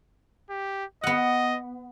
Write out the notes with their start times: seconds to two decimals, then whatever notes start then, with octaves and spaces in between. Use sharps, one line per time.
0.50 G4
1.03 B3 D#5 F#5